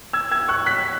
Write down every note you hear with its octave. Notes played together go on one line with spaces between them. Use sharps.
E6 G#6
E6 G#6
C#6 F#6
F#6 B6